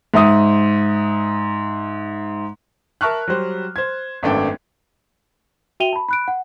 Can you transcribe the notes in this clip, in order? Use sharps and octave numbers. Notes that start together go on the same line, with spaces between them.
G#2 E5 D#6
A#4 E5 A5 C#6 F6 F#6
F#3 G3 C5
C5 G#6
G#1 F#2 A3 B3 D4 G5
F#4 E5 G5 D#7 F7 G7
A5 B5
B5 F#6 D7
F#5